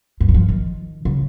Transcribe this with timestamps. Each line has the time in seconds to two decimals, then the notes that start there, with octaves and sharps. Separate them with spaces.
0.20 G2
0.29 D#3
0.34 F3
0.48 D#3
1.05 C#3